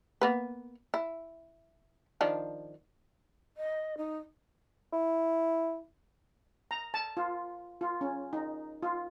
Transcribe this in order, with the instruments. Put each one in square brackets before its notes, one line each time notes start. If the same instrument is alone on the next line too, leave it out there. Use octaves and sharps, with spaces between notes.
[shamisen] A#3 B3 B4
E4
D#3 F3 D4
[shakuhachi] D#5
D#4
[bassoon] E4
[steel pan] A#5
A5
F4
F4
C#4
D#4
F4